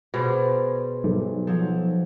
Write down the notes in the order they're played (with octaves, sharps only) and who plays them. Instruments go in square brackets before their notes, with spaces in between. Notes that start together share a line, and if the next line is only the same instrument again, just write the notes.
[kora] B2 [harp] G#4 C5 D5
[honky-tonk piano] B1 [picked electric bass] G3
[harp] F3 F#3